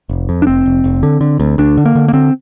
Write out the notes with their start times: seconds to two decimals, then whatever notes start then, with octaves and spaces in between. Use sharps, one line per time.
0.09 F1
0.29 F2
0.42 D4
0.47 F1 C4
0.66 F1
0.84 F1
1.03 D3
1.21 D3
1.40 D2
1.58 D2 D4
1.77 D3
1.86 A#3
1.95 D3
2.08 A#3
2.13 D3 C4